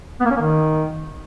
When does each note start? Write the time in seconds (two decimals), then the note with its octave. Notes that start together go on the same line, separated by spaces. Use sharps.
0.20 B3
0.25 A#3
0.31 C#4
0.36 A#3
0.41 D#3